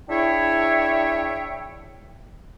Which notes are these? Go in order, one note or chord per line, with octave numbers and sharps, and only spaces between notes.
D4 E4 G#4 C#5 E5 G5